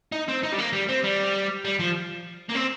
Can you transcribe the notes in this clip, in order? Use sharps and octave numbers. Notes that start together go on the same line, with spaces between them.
D#4
C4
D#4
G3
A#3
G3
C4
G3
G3
F3
A#3
C4